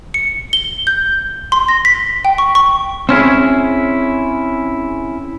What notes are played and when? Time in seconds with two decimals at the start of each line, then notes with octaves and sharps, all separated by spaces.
0.14 C#7
0.53 G7
0.87 G6
1.52 C6
1.68 A#6
1.85 B6
2.25 G5
2.38 C#6
2.55 C#6
3.09 C4 C#4 E4 G#4